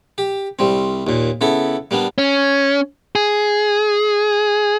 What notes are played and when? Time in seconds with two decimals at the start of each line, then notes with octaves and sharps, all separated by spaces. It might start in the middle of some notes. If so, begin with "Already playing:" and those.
0.18 G4
0.59 C2 G3 C4
1.07 D#2 A#2
1.41 C#3 B3 E4 A4
1.91 G3 A#3 B3 D4
2.18 C#4
3.15 G#4